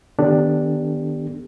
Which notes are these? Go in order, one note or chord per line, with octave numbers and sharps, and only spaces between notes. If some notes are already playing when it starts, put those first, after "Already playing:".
D#3 B3 D4 G4 A4